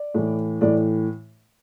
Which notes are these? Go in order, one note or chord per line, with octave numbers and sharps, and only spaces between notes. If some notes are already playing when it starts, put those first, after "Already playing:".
Already playing: D5
A2 E3
A2 E3 D5